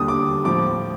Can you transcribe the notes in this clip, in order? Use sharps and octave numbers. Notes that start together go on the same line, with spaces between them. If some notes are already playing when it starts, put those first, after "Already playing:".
Already playing: D#2 D3 G3 D#6
D6
A2 F3 D6